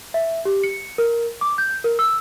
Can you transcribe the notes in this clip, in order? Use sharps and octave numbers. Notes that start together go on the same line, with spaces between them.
E5
G4
C#7
A#4
D6
G6
A#4
E6